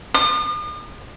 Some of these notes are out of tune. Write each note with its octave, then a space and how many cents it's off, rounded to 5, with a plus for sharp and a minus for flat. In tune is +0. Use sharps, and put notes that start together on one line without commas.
D#6 -45